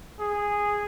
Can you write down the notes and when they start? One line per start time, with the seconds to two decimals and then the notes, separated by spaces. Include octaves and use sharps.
0.20 G#4